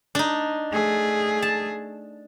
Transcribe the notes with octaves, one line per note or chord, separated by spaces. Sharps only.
D4 D#4
A3 G#4
A5